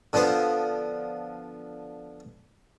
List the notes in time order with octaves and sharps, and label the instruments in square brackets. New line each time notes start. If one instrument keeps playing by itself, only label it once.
[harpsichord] D3 F3 B3 C5